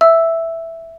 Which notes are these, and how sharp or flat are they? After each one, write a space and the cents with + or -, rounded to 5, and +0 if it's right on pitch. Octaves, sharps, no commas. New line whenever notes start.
E5 +0 E6 +0